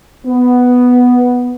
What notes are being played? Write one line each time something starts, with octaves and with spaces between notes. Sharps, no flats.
B3